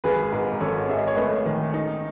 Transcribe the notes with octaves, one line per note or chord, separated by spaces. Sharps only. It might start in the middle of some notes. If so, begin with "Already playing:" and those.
G#1 G#4 B4
G#2
G#1 A4 C#5
G#4 E5
D#5
C#5
A3 B4 D#5
D#3
D#4